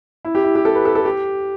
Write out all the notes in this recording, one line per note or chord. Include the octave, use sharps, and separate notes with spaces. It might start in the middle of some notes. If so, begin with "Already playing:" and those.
E4
G4
E4
G4
A4
B4
A4
A4
G4